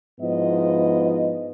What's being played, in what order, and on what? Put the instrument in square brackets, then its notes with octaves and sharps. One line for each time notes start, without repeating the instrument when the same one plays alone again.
[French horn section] G#2 F3 B3 E4 D#5